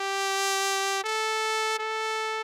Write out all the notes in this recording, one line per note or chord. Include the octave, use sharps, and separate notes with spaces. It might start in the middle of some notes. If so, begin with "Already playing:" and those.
Already playing: G4
A4
A4